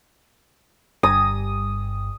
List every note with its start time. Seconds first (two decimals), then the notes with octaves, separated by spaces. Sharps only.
1.03 G1 G2 D#6